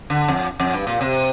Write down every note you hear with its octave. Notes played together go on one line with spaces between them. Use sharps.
D3
F2
F2
G2
A#2
C3